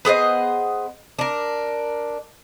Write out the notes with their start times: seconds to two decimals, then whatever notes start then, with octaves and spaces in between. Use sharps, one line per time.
0.05 B3 G#4 C5 D#5
1.19 D4 A#4